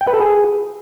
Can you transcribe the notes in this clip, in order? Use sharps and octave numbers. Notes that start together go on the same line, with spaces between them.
G5
B4
A4
G#4